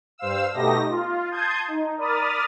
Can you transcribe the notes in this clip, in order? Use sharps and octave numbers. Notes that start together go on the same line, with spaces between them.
G2 C5 F5 E6
B2 A3 D#4 G4 D#5 A#6
F4
A5 C6 D#6 G6 G#6
D#4
A#4 D5 B5 D#6 F6 A6